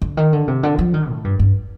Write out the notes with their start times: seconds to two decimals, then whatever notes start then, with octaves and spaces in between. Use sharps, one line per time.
0.02 D3
0.17 D#3
0.33 D3
0.48 C3
0.63 D3
0.79 F3
0.94 D#3
1.09 A2
1.24 G2
1.39 G2